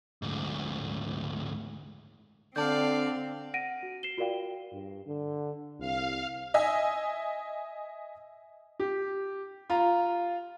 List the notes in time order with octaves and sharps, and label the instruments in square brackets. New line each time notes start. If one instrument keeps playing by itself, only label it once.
[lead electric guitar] D2 G#2
[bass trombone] D3 [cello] C4 [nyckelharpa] D5 F5 [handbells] A5 G6
[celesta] F#5 A#6 D7 D#7
F#4
C7 E7 G7
F4 F#4 A#4 D5 F5 G5
[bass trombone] G2
D3
[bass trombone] C2 [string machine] F5
[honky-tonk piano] D#5 E5 G#5
[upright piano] G4
F4 A#5